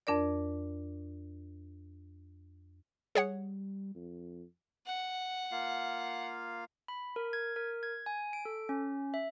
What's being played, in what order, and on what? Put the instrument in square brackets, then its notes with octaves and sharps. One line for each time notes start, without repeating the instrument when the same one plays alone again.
[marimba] F2 D4 A#4 D5
[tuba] G3 [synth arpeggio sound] G#4 C#5 F#5
[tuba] F2
[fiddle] F#5
[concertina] A#3 F4 F5
[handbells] B5
A#4
G#6
A#4
G#6
G#5
D7
A4
C#4
E5